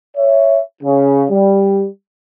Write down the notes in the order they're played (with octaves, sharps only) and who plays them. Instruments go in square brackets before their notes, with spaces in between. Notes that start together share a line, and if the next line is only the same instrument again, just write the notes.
[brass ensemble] C#5 E5
C#3
G3